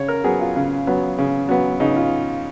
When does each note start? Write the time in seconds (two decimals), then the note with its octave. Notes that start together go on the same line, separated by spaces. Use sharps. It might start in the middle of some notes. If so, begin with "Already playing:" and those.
Already playing: C#3 C#5
0.08 A#4
0.24 F#3 B3 G#4
0.40 F4
0.56 C#3
0.87 F#3 B3
1.18 C#3
1.49 F#3 B3
1.80 C#3 D#4
1.96 F4